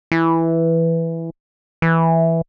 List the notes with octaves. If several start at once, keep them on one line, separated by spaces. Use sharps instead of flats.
E3
E3